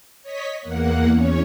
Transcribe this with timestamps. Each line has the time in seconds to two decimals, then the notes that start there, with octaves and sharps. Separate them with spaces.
0.23 C#5 D#5 B6
0.60 E2 A#3 F#5
1.11 E2 C#4 C#5